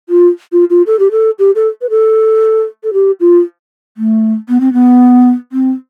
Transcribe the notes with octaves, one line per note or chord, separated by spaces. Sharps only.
F4
F4
F4
A4
G4
A4
G4
A4
B4
A4
A4
G4
F4
A3
B3
C4
B3
C4